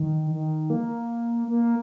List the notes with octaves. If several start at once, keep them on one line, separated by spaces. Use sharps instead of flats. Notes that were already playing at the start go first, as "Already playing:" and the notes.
Already playing: D#3
D#3
A#3
A#3